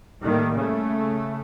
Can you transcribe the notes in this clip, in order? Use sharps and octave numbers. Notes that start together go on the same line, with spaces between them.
A2 D#3 G3 A3 A#3
C#3 A3